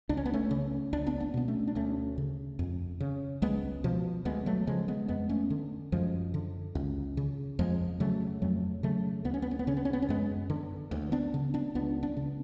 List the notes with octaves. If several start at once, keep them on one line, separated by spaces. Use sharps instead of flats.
C#2 D4
C#4
B3
A3 C#4
C#3
C#2 D4
B3 D4
B3 D4
B2 B3
A3 C#4
D4
D2 A3 C#4
C#3
F2
C#3
C#2 G#3 B3
B2 F3
D2 G#3 B3
F#3 A3
C#3 F3 G#3
G#3 B3
F2 G#3 B3
A3 C#4
D3
F#2 F3 G#3
D3
C#2
C#3
F2 F3 G#3
C#3 F#3 A3
F2 F#3 A3
C#3 F#3 A3
D2 B3
C#4
B3
C#4
B3
C#3 C#4
B3
C#4
B3
C#4
F#2 G#3 B3
D3
D2
B3 D4
C#3
B3 D4
C#2 B3 D4
B3 D4
C#3